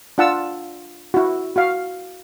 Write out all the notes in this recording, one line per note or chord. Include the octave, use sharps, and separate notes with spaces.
D4 F4 F#5 A5 E6
E4 F#4
F#4 F5